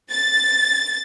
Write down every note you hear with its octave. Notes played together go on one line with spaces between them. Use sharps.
A6